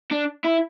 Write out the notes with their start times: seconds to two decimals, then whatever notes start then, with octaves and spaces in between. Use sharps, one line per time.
0.11 D4
0.44 E4